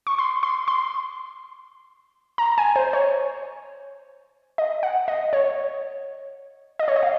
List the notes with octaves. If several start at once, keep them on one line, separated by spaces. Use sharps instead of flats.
C#6
C6
C6
C6
A#5
G#5
C5
C#5
D#5
F#5
D#5
C#5
D#5
C#5
D#5
F5